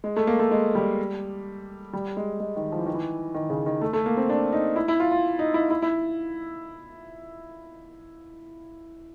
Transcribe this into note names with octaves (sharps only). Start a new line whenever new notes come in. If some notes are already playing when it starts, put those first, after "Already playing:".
G#3
A3
A#3
A3
G#3
G3
G3
G#3
G#3
D#3
F3
E3
D#3
E3
D#3
C#3
D#3
A3
A3
A#3
C4
D4
D#4
E4
E4
F4
F4
D#4
E4
E4
E4